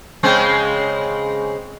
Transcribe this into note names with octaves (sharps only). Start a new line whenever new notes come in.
C#3 G#3 C4